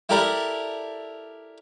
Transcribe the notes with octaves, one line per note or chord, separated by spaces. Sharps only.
E4 G4 A4 A#4 D5 E5